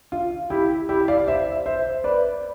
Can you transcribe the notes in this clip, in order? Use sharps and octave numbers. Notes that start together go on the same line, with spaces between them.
F4
E4 G4
E4 G4
D5 F5
C5 E5
C5 E5
B4 D5